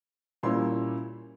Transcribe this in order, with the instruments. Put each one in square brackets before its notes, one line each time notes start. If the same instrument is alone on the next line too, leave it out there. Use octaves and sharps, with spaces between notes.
[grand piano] A#2 G3 A#3 C#4 E4 C6